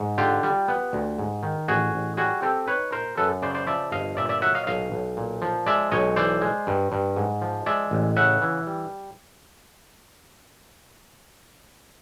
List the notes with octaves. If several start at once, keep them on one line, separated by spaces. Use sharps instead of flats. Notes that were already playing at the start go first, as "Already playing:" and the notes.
Already playing: G#2
D3 F4 G4
G3
B3
D2
G#2
D#3
A1 F#4 G#4
A1
G3 F#4 G#4
C4 G4 A4
D#4 B4 C#5
A#2 A#4 C5
F#2 A4 B4
C#3 C5 D5
C5 D5
F3 D5 E5
G1 D#5 F5
A#2 D5 E5
D5 E5
F#3 E5 F#5
D#5 F5
B1 D#5 F5
B1
A#2
F3
G#3 D5 E5
B1 C#5 D#5
E3 C5 D5
G#3
G2
G2
G#2
F3
G#3 D5 E5
A1
C#3 E5 F#5
E3
G3